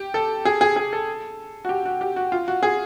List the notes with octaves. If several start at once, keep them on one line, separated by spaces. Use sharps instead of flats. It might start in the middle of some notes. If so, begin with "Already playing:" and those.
Already playing: G4
A4
G#4
G#4
G#4
A4
F#4
G4
F#4
G4
F#4
F4
F#4
G#4